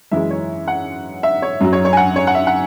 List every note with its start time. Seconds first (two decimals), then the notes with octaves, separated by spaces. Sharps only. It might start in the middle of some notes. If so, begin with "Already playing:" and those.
0.11 F#2 E3 G#3 E5
0.31 C#5
0.68 F#5
1.23 E5
1.42 C#5
1.61 F#2 F#3
1.73 C#5
1.85 C#5
1.93 G#5
1.97 F#5
2.16 C#5
2.27 F#5
2.35 E5
2.47 F#5